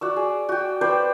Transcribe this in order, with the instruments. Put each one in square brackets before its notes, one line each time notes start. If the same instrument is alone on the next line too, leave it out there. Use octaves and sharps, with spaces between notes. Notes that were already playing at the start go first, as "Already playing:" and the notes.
[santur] F#4 D5 E6
G#4
F#4 G5
B4 C5 D5 G5